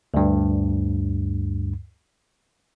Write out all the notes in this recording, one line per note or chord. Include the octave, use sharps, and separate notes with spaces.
D2 G2